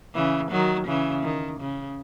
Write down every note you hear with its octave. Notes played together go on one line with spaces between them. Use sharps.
C#3 E3
D#3 F#3
C#3 E3
D#3
C#3